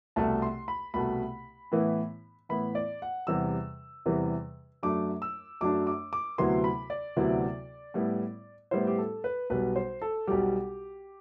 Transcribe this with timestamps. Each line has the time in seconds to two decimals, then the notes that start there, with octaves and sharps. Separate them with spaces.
0.16 C2 B2 A3 A5
0.42 C6
0.68 B5
0.94 C2 B2 A3 B5
1.72 A2 E3 B3 E4
2.49 A2 E3 B3 E4 B5
2.75 D5
3.02 F#5
3.27 E2 C3 E3 G3 E6
4.06 E2 C3 E3 G3
4.83 F#2 F#3 A3 D4 D6
5.22 E6
5.61 F#2 F#3 A3 D4 D6
5.87 D6
6.13 D6
6.38 D2 C3 F#3 B3 E4 C6
6.64 B5
6.90 D5
7.17 D2 C3 F#3 B3 E4
7.94 A2 G3 B3 E4
8.71 A2 G3 B3 E4 C5
8.87 G4
8.98 A4
9.24 B4
9.50 B1 B2 G3 B4
9.76 C5
10.02 A4
10.27 B1 B2 G3 G4